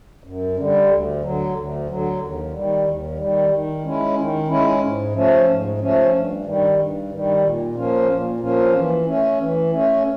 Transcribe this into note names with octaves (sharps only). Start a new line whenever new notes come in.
F#2
D3 G3
D2
D3 F#3
D2
D3 F#3
D#2
D#3 G3
D#2
D#3 G3
D#3
G#3 C#4 E4
D#3
G#3 C#4 E4
G#2
F3 A3 C#4
G#2
F3 A3 C#4
G2
D#3 G3
G2
D#3 G3
A#2
F3 A#3 C#4 F4
A#2
F3 A#3 C#4 F4
E3
A3 C#4
E3
A3 C#4